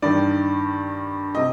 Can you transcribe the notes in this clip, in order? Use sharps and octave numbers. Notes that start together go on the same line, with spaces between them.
G2 D#3 D5
C3 D#5